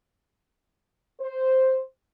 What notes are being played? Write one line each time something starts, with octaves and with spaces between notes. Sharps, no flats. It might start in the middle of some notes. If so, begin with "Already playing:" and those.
C5